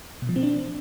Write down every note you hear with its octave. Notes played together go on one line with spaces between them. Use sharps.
B2
F3
C4
D4